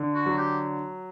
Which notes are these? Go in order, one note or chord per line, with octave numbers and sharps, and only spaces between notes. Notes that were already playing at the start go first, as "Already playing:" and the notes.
Already playing: D3
F#4
F#3
G4